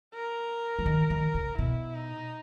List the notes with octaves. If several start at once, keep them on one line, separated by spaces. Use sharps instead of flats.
A#4
E3
D#3
D#3
C#3
B2 E4
D#4